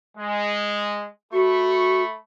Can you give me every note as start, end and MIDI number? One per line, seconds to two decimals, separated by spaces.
0.18 1.06 56
1.33 2.16 57
1.33 2.03 66
1.33 2.16 83
1.33 2.16 85